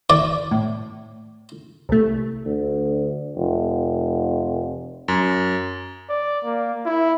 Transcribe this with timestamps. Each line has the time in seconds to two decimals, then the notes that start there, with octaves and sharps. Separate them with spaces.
0.10 D5
0.51 A2
1.89 C2 A3
2.45 D2
3.36 F1
5.08 F#2
6.10 D5
6.45 A#3
6.86 E4